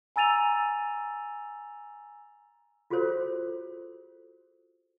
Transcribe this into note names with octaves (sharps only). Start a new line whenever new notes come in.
G#5 A#5 E6 A6 D#7 F7
F4 F#4 G#4 A4 C5 C#5